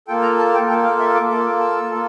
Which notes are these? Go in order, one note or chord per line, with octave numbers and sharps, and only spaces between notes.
A#3 F4 A4 G5
A#5
A5
G5
A#3 F4 A4 G5
F5
E5
D6
A#3 F4 A4 D6
E6
A#3 F4 A4